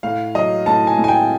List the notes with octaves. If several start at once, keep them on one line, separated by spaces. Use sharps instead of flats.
A2 F5
F#3 D#5
A2 A5
G#5
A2
G#5
G5